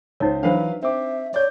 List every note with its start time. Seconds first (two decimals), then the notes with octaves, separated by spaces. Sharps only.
0.20 C#2 D#4 C5 C#5
0.43 E3 F#3 D4 B4 C5 F5
0.83 C4 E5 D6
1.34 C#5 D5 G6